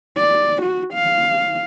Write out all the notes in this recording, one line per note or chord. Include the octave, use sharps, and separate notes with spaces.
D5
F#4
F5